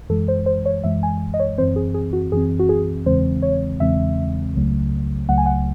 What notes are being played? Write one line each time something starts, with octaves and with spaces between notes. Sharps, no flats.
F#2 E3 G#3 A4
C5
C5
C#5
F#2 E3 G#3 E5
G#5
D#5
C#5
F#2 E3 C4 C5
G#4
G#4
F#4
F#2 E3 C4 G#4
F#4
G#4
E2 C#3 E3 G#3 C4 C5
C#5
E2 C#3 E3 G#3 C4 E5
C#2 C#3 F#3 A3
C#2 C#3 F#3 A3 F#5
G#5
F#5